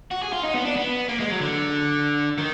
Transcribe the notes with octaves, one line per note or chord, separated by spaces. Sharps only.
F#4
G#4
F4
D#4
B3
D4
B3
A#3
G#3
F#3
D3
D#3